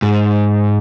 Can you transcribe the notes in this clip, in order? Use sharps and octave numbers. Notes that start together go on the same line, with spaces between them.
G#2